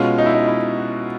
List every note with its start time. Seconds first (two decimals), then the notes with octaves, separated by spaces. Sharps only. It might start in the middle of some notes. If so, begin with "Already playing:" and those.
Already playing: B2 G#3 C#4 F4
0.18 D#4
0.26 E4
0.33 D#4
0.48 E4
0.78 F#4